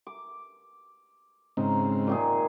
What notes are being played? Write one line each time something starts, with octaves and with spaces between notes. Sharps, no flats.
D6
G#2 C#3 C4 D#4
A#2 D#3 G#4